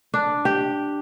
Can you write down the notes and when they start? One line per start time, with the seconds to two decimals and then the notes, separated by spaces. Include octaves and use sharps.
0.14 D4
0.45 G4